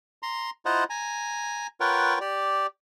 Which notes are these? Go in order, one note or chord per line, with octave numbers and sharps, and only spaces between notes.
A#5 C6
E4 F4 C5 D#5 F#5 A#5
G#5 A#5
F4 A#4 B4 C#5 F#5 G5
G4 D5